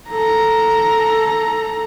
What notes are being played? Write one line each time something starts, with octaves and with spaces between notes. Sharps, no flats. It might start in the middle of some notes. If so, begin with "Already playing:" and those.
A4 A#5